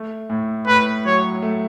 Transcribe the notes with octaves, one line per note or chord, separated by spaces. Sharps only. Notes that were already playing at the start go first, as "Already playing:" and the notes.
Already playing: A3
A2
A2 B4
F#3 C#5
A3